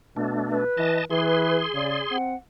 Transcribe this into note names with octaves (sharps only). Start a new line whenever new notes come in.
B2 A3 D4
B4
E3 D#5 A5
E3 G#4 B4 C6
C#3 D5
C4 F#5